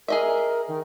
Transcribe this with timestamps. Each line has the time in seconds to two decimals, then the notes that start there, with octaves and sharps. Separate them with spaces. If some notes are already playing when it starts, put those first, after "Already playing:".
0.08 G#4 A#4 D#5 E5
0.68 D#3